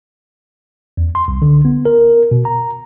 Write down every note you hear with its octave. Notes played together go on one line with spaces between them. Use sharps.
E2
C6
C2
D3
B3
A#4
B2
A#5